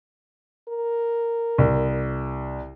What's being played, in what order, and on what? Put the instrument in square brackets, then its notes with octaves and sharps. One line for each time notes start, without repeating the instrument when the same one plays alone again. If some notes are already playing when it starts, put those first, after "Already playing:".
[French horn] A#4
[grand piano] C2